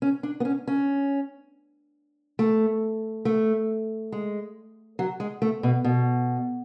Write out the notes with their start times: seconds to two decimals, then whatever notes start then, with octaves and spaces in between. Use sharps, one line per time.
0.02 C#4
0.23 D4
0.40 B3
0.45 C#4
0.68 C#4
2.39 A3
3.25 A3
4.12 G#3
4.99 F#3
5.20 G#3
5.42 A3
5.63 B2
5.85 B2